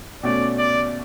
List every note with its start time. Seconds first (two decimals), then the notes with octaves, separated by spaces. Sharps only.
0.23 B2 A3 C#4 D5
0.58 D5